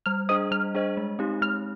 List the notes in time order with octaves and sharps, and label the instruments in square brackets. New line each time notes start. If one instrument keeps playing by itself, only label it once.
[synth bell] G3 [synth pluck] F6
[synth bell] D4 G#4 C5 D#5 [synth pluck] D#6
[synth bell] G3 [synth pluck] F6
[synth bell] D4 G#4 C5 D#5
G#3
C4 D#4 G4
[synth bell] G#3 [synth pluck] F6